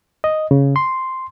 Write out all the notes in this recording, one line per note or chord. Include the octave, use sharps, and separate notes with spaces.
D#5
C#3
C6